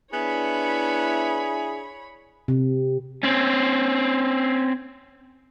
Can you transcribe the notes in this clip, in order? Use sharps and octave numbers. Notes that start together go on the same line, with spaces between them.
B3 D4 E4 G#4 C#5 B5
C3
C4 C#4